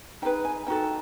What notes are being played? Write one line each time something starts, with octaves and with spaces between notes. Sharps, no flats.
D#4 G#4 B4 G5
G#5
D#4 F#4 A4 G5